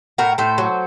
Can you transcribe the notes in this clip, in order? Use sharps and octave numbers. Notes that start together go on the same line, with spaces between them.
A2 F#4 A#4
A2 A4 C5
F#3